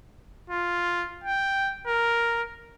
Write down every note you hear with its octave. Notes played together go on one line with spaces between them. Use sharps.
F4
G5
A#4